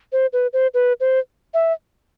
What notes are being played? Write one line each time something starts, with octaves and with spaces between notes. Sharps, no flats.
C5
B4
C5
B4
C5
E5